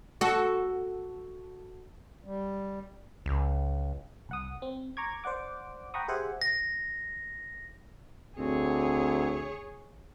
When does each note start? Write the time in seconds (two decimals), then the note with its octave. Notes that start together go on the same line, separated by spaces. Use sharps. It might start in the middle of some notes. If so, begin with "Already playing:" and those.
0.21 F#4 A4
2.25 G3
3.26 C#2
4.29 C2 F#5 D#6
4.62 C4
4.97 A#5 C#6 D6 G#6
5.24 C5 D5 F#5 D6
5.94 F#5 G5 A#5 B5 C#6 D#6
6.08 G4 G#4 C5 E5 F#5 G#5
6.42 A#6
8.38 D2 C4 G#4 C#5